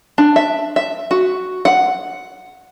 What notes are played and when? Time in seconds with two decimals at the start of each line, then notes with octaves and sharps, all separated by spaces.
0.18 D4
0.36 E5
0.76 E5
1.11 F#4
1.65 F#5